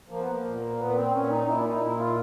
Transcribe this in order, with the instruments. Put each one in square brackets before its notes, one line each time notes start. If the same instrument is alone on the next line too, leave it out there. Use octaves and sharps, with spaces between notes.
[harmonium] F3 A#3
B3
A#3
A#2
A#2 B3
C4
A#2 C#4
D#4
A#2 E4
D4
D#4
A#2 E4
F4